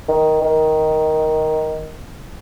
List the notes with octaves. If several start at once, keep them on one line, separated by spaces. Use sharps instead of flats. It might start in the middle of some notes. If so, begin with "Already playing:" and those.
D#3
D#3